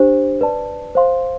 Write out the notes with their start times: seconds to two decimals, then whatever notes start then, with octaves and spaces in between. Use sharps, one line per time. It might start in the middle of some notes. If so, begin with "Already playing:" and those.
Already playing: D4 G4 C5
0.41 B4 D5 A5
0.95 C5 F5 C6